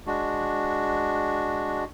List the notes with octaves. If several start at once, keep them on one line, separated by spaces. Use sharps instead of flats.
G#3 D4 F#4